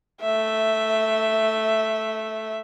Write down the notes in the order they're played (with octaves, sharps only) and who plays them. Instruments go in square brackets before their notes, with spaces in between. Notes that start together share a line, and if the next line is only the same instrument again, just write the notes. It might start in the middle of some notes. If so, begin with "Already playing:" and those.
[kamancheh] A3 E5